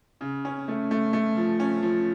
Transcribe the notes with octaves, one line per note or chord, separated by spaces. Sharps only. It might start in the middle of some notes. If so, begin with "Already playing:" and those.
C#3
C#4
A3
A3
A3
F3
C#4
F3